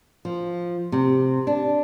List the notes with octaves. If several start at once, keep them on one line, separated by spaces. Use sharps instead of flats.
F3
C3
D4